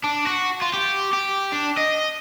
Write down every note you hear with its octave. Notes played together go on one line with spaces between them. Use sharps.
D4
F#4
F4
G4
G4
D4
D#5